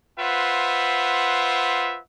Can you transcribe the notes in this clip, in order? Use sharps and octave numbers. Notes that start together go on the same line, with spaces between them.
F4 B4 C5 E5 F#5